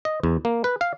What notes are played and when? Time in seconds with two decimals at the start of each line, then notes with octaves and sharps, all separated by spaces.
0.05 D#5
0.23 E2
0.45 A#3
0.64 B4
0.81 F5